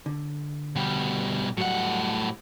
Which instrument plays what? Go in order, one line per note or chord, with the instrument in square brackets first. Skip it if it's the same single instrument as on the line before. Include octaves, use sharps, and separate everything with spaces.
[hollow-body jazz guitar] D3
[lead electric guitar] B2 G3
[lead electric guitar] A2 F#5 [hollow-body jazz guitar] F#3 G3